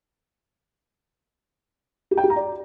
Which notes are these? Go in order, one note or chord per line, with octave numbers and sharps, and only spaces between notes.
G4
G5
G4
A#5
D5